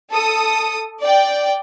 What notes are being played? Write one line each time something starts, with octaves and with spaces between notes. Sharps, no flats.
A4 D#6
D5 G5